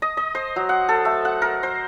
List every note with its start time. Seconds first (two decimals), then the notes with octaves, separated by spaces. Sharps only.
0.02 D#5
0.17 D#5
0.35 C5
0.56 F#3
0.69 F#5
0.89 A4
1.05 A3
1.25 F#5
1.42 A#4
1.63 C5